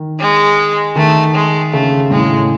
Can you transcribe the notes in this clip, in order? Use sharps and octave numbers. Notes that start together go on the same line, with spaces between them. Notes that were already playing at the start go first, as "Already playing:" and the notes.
Already playing: D#3
G#3
D#3 A3
G#3
C#3 A3
A2 G#3